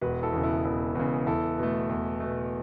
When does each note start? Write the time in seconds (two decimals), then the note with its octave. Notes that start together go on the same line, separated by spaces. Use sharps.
0.01 E1 F#4 B4
0.22 E4 A4
0.33 E2 C#3
0.43 B3 E4
0.65 E1 B3 E4
0.95 E2 C#3
1.26 E2 E4 A4
1.58 B2 A3
1.89 E2
2.20 B2 A3